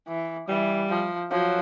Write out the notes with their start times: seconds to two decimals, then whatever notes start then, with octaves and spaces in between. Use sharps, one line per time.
0.08 E3
0.48 E3 G3
0.89 F3
1.31 F3 F#3